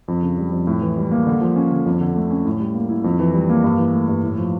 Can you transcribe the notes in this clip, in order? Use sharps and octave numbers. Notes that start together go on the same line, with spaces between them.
F2
C#3
G3
F2
A2
E3
G3
A#3
D3
F3
C#4
D3
F2
D3
A3
C#4
A2
G3
A#3
E4
F2
E3
G3
A#3
G2
E3
A3
G2
A2
F3